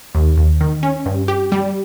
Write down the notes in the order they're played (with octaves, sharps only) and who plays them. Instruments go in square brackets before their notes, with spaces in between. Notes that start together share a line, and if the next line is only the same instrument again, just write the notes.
[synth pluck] D#2
D#2
D#3
C#4
G2
G4
G3